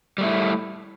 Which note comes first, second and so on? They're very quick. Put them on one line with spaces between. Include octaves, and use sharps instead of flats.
G3 A3 E4